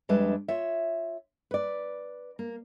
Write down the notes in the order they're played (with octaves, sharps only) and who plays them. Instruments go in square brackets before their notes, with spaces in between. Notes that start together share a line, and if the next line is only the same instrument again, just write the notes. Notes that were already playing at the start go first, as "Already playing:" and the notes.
[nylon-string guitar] F2 G3 G#3 D4 B4 E5
F4 C#5 E5
B4 D5
A#3